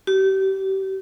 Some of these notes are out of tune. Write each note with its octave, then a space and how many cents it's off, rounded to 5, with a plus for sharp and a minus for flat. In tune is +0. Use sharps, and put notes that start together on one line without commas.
G4 -30